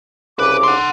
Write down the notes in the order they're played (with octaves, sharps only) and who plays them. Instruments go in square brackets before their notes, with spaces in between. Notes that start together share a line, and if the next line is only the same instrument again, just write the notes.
[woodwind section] C2 C#3 D6 [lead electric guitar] B4
[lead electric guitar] F#5 C6